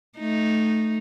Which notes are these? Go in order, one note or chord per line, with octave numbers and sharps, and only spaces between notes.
A3 D#4